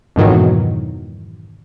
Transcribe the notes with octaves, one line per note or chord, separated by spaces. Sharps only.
F2 G#2 B2 D#3 E3 F#3